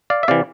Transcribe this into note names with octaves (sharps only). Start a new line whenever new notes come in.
D5 F5
E5
C3 E3 D5 F5